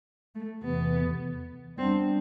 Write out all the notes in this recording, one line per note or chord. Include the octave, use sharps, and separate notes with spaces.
A3
E2 C3 E3 B3
G3 B3 C4 D4